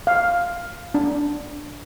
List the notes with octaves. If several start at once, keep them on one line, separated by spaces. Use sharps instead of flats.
F5
D4